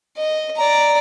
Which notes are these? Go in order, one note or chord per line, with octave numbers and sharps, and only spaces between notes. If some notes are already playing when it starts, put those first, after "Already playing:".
D#5
D5 A#5